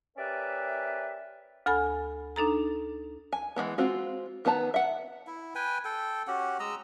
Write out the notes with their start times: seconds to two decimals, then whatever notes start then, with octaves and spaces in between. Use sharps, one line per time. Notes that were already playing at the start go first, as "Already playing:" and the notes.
0.17 C#4 G4 A#4 B4 D5 E5
1.66 D2 A4 G#5 B5
2.36 D4 D#4 A4 A#5
3.33 G#5
3.56 E3 F#3 G#3 B3
3.78 G#3 C4 F4 F#4
4.45 D#3 B3 B4 A5 A#5
4.74 E5 F#5
5.27 E4
5.55 B4 G5 G#5
5.85 A4 G5
6.27 C#4 F#4 G4 F#5
6.60 G#3 D#5 A#5 E6